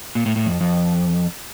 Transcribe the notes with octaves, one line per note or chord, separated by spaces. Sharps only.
A#2
A2
A2
F2
F2